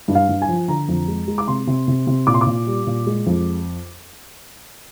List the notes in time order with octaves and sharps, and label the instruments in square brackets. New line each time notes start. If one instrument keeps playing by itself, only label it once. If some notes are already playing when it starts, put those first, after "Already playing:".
[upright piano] G2
F5
G2
G#5
F3
D3 A#5
F2
G#3
G#3
D6
C3 C6
C3
C3
C3
A#2 D6
C6
D6
A#2
G3
A#2
G#3
F2